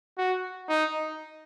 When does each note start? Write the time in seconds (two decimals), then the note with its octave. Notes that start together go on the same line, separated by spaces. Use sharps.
0.18 F#4
0.69 D#4